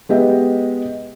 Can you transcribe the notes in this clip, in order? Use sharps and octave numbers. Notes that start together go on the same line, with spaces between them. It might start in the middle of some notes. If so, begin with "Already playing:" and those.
G#3 B3 G4 D#5 E5